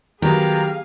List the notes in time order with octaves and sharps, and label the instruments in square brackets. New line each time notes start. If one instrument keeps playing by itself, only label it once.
[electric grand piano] D#3 F#3 B3 [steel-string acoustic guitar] G4 [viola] G#4 F5 [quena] A#5